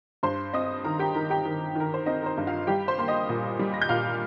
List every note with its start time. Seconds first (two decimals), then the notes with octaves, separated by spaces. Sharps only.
0.23 G2 C5 C6
0.53 C4 D#5 D#6
0.84 D#3 A#4 A#5
0.99 G4 G5
1.14 D#3 A#4 A#5
1.30 G4 G5
1.45 D#3
1.75 D#3 A#4
1.94 C5
2.06 C4 D#4 D#5
2.22 A#4
2.26 C5
2.38 G2
2.47 F4 F5
2.67 G3 G4 G5
2.88 C5 C6
2.98 A#3 C6
3.08 D#5 D#6
3.29 A#2
3.59 G3
3.74 A#6
3.82 G6
3.89 A#2 F5 F6